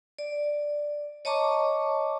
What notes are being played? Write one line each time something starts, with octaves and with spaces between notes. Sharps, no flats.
D5
C#5 D#5 A5 A#5 C#6 D6